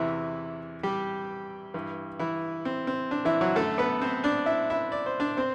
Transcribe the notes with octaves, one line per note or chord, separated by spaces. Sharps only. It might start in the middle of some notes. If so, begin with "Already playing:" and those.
Already playing: E2 C3 E3 E4
G3 G4
G2 E3
E3 E4
C4
C4
D4
E3 E4
F#3 F#4
F#2 D3 A3 A4
B3 B4
C4 C5
D4 D5
E4 E5
E4 E5
D5
C5
D4 D5
C4 C5